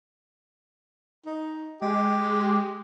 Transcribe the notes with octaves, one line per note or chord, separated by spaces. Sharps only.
D#4
G#3 G4